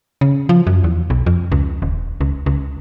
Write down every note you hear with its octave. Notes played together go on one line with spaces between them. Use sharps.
C#3
F3
F#2
E2
B1
F2
C#2
D#1
C#2
C#2